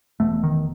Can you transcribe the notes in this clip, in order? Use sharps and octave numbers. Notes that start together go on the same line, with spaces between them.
E1 E2 B2 A3
D#3